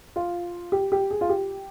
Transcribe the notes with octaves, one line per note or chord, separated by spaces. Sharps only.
F4
G4
G4
G#4
F4
G4